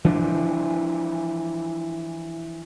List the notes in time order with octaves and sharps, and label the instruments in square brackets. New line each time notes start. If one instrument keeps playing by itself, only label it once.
[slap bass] E3 F3 D4